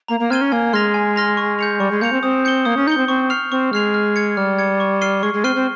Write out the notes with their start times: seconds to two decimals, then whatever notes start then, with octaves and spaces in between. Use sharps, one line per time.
0.08 A#3 A#5
0.20 A#3
0.30 C4 F6 G#6 D#7 G7
0.41 C#4
0.52 A#3 G#5
0.73 G#3 C6 F6 A#6 F7
0.94 G#5
1.16 C6 F6 A#6 F7
1.37 C#6
1.59 G6 C#7 F7
1.80 G3 C#6
1.91 G#3
2.01 A#3 G6 C#7 F7
2.12 C4
2.23 C4 D#6
2.45 G6 C#7 G7
2.65 A#3 D#6
2.77 C#4
2.87 D#4 G6 C#7 G7
2.97 C4
3.08 C4 C#6
3.30 F6 C7 F7
3.51 C4 C#6
3.73 G#3 F6 C7 F7
3.94 F6
4.16 G#6 C#7
4.37 G3 F6
4.59 G#6 C#7
4.80 C#6
5.01 F6 C7 D#7 G7
5.23 G#3 C#6
5.34 G#3
5.44 C4 F6 C7 D#7 G7
5.55 C4